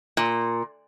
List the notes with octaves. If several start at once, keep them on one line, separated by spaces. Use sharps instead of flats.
A#2